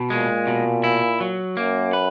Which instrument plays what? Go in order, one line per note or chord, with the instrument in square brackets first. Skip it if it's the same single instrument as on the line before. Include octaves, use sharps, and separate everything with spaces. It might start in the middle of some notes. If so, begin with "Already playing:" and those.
Already playing: [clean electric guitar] B2
[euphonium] A#2 [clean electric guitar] G#3
[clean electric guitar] B2
E4
F#3
[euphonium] F#2 [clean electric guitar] A#3
[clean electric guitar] B4